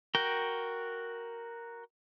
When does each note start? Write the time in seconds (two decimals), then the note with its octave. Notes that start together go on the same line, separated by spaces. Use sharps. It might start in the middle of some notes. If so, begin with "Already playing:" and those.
0.15 F#4 A#4 G5